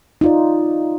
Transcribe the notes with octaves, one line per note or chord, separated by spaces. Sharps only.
D#4 F4 D5